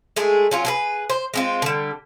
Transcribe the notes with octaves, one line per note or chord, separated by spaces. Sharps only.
G#3 A3 G#4
F#3 C#4 F4
G#4 A4 B4
C5
G#3 C4 F4
D3 G3